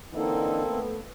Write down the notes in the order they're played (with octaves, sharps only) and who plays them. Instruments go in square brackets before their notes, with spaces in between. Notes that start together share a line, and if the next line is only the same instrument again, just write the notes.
[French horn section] D3 E3 D#4 [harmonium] A#3 C4 A4
[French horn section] A3 B3